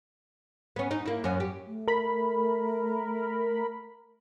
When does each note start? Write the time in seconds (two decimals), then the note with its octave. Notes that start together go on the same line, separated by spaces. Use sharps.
0.76 B3 C#4
0.91 D#4
1.06 A#3 E4
1.24 F#2 C#4
1.40 G4
1.66 A3
1.88 A#4 B5